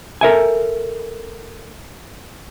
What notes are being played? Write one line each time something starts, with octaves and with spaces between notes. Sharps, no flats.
A4 A#4 E5 G#5